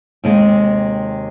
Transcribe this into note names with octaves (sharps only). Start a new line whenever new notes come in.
D#2 C3 G#3